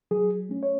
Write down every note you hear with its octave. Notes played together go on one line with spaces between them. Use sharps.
F#3 G#4
A3 C#4
C#5